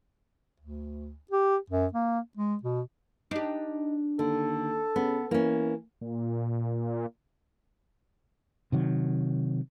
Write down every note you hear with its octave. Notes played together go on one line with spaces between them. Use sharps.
D2
G4
F#2
A#3
G#3
B2
D4 D#4 G4
D#2 D3 A4
C#3 B3
E3 A#3 C#4
A#2
C3 D#3 F#3